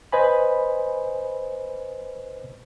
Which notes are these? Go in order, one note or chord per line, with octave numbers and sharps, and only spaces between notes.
B4 C5 D#5 G#5 B5